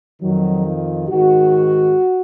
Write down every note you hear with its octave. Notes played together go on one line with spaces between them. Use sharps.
F2 D#3 F#3
F4
G#2 D#3 F#4